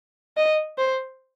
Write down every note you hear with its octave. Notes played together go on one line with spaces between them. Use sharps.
D#5
C5